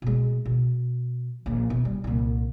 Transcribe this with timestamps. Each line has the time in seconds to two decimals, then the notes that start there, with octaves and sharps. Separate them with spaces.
0.02 B2 G#3
0.46 B2
1.46 A#1 C#4
1.70 B2
1.85 G3
2.04 C2 A#2